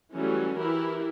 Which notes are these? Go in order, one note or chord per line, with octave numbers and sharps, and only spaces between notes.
E3 F#3 G3 A3 C#4
E3 E4 G4 A#4